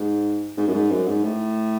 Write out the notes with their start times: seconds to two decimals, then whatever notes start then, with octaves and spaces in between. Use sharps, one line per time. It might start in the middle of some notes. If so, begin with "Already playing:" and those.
Already playing: G#2
0.57 G#2
0.67 F#2
0.73 G#2
0.90 F#2
1.07 G#2
1.23 A2